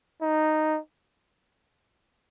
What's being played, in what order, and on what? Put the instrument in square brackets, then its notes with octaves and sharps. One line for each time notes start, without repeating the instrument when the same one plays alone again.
[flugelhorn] D#4